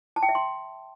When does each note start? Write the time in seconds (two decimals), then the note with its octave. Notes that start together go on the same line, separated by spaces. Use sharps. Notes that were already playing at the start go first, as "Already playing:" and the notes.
0.16 A5
0.23 G5
0.29 E5
0.35 C6